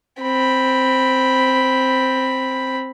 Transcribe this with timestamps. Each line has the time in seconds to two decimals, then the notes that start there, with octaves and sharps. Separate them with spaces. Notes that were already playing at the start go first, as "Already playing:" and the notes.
0.21 C4 B5